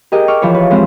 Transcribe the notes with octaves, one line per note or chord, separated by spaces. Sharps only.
G4 G#4 A#4 D#5
C#6 D6 F6
E3 F3 B4 C#5
B4
G#3 C4 B4 C5 F5